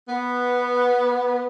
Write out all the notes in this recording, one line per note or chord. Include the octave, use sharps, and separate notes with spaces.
B3